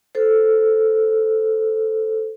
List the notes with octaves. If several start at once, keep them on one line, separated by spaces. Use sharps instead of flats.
A4 C5